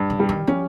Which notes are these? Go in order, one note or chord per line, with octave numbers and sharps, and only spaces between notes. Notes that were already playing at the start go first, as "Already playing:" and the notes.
Already playing: G2
C#3
G3
D#3
F3 C#4